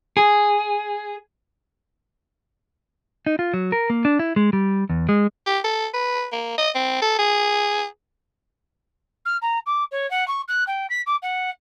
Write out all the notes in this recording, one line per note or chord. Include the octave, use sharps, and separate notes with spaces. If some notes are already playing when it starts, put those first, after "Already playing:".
G#4
D#4
F4
F#3
A#4
A#3
D4
E4
G#3
G3
E2
G#3
G4
A4
B4
A#3
D#5
C4
A4
G#4
F6
A#5
D6
C#5
F#5
C#6
F#6
G5
B6
D6
F#5